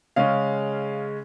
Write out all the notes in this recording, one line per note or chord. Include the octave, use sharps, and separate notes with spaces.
C#3 G#3 C#4 F5